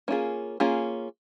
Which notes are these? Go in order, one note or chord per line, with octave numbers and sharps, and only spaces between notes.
A#3 C#4 F4 G#4
A#3 C#4 F4 G#4